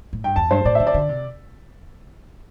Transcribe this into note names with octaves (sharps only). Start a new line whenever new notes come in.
A2
G2 G5
E2 A5
G2 C5
A2 D5
D3 E5
D5
D3
C3